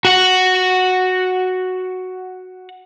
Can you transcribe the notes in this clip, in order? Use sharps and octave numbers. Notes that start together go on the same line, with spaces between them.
F#4 F#5